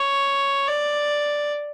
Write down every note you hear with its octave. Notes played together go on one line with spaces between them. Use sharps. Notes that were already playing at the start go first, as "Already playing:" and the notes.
Already playing: C#5
D5